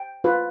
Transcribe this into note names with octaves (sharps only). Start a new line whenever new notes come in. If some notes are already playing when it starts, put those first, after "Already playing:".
Already playing: G5
F4 B4